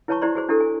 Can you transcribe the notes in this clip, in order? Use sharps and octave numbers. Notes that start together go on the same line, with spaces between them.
E4 B4 C#5 A5 A#5 C#6
E4 G4 C5 D5 A#5 C6
F#4 G#4 C5
D4 E4 G4 A4
G#5